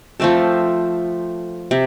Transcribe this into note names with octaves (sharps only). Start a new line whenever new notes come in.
F3 A3 C4 A4
C3